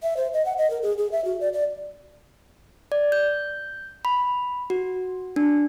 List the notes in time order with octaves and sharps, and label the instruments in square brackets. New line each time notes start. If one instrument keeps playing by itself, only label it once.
[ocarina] E5
C5
D#5
F#5
D#5
A#4
G#4
G#4
E5
F#4
D5
D5
[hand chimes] D5
G6
B5
F#4
D4